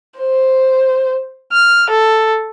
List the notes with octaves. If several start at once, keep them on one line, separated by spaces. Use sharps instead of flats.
C5
F6
A4